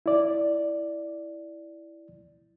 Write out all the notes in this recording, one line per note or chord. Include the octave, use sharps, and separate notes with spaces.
E4 D5